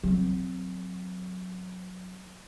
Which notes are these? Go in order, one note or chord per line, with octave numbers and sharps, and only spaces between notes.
F#3 C4